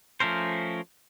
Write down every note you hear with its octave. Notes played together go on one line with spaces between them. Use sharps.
F3 A3 C#4 A#4 C5